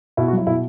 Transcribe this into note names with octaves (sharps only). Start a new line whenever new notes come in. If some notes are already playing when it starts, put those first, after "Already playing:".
B2 E4
F#4
F#3 E4
B2 E4